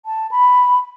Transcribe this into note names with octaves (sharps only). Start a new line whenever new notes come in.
A5
B5